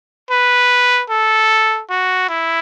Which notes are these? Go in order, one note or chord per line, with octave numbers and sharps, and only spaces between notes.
B4
A4
F#4
E4